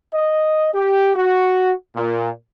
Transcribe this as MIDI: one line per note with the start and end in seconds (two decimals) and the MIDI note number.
0.14 0.70 75
0.74 1.13 67
1.16 1.73 66
1.95 2.31 46